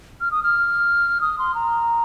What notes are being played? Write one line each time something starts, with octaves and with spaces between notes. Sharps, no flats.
F6
D#6
F6
D#6
C6
A#5